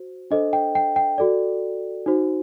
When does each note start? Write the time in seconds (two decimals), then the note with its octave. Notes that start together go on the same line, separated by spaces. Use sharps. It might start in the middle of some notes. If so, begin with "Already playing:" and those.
Already playing: F#4 C5
0.31 D4 A4 C5 D#5
0.53 G5
0.75 G5
0.96 G5
1.18 F#4 A4 D5
2.06 D#4 F#4 C5